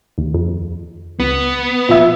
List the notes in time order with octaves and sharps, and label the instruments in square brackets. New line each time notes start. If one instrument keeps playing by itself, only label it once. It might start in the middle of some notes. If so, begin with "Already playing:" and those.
[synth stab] D#2
F2
[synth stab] C#2 [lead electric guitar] B3
[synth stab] A#2 F3 E5